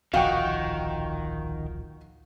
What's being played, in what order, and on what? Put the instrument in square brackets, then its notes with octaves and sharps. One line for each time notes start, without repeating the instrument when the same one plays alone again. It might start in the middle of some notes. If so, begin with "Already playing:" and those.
[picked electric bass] D1 A#1 F3 [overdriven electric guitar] D#3 [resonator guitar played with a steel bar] F#4 [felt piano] F5 G5 C#6